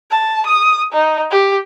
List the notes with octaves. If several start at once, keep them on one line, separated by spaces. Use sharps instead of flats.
A5
D#6
D#4
G4